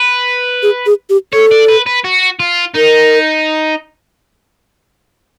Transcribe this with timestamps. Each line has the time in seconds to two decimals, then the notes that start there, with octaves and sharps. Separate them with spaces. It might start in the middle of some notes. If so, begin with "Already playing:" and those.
Already playing: B4
0.63 G#4
0.86 G#4
1.10 G4
1.33 A4 C#5
1.51 D5
1.68 B4
1.86 B4
2.04 F#4
2.40 F4
2.75 D#4 A#4